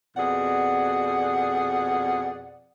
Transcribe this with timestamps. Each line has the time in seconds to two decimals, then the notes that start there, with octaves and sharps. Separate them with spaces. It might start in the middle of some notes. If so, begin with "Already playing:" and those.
0.17 F2 B2 G#4 D5 F#5